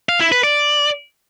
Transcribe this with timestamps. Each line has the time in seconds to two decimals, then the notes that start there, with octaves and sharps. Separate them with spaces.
0.09 F5
0.20 E4
0.32 B4
0.43 D5